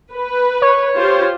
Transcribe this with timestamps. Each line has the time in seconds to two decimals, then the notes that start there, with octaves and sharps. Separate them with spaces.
0.13 B4
0.62 C#5
0.96 F4 G4 C5